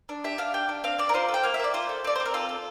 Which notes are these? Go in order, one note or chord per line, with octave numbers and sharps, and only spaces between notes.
D4
G4 E5
D4 F5
G4 G5
D4
C4 F5
C4 D5
A#4
F4 C5
A4
G5
A#3 F5
E5
A#3 D5
F4 C5
A4
C4 D5
C5
C4
A#4
F4 A4
A4